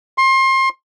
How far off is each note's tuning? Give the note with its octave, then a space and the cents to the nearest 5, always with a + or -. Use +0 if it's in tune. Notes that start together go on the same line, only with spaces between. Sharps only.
C6 +30